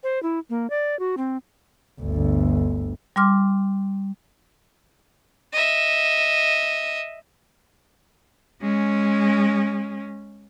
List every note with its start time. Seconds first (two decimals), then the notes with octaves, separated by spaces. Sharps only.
0.03 C5
0.23 E4
0.50 A#3
0.70 D5
0.99 F#4
1.17 C4
2.01 G1 D2
3.16 G3 C6 D6 F6
5.53 D#5 E5
8.61 G#3 C#4